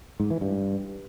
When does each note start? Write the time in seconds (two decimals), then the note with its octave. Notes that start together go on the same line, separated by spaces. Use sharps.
0.20 G#2
0.30 E3
0.41 G2